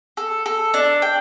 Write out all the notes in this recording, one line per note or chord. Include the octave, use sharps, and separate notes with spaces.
A4
A4
D4
G5